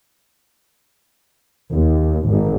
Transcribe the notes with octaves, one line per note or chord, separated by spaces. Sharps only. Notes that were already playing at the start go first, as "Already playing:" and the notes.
D#2
G#1